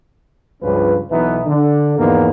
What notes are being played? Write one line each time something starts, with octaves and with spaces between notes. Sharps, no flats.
C#2 G2 F3 C#4 F4 B4
B1 B2 E3 B3 D#4 B4
D3 D4
E2 G#2 F3 G#3 A#3 B3